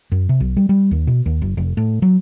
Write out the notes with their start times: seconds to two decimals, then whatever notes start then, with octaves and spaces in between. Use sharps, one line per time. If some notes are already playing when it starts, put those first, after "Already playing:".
0.12 F#2
0.29 C3
0.40 B1
0.57 G3
0.69 G3
0.91 D#2
1.07 B2
1.26 D#2
1.42 F#1
1.57 F1
1.77 A2
2.02 F#3